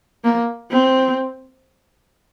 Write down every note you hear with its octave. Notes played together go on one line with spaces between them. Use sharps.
A#3
C4